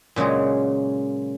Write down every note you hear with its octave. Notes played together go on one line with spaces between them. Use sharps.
A#2 C#3 F#3 G#3 G#4